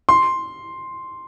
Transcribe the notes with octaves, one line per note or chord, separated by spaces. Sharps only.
C6